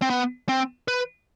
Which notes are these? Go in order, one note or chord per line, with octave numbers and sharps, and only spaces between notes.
C4
B3
C4
B4